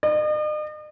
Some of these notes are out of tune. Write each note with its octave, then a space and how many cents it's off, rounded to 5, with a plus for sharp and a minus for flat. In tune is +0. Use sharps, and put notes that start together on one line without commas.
D#5 -45